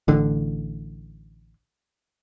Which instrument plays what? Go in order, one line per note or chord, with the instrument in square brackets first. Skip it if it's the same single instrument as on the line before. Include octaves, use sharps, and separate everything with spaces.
[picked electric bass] A1 D3